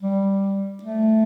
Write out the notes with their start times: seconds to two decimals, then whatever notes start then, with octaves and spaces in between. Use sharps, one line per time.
0.02 G3
0.83 A3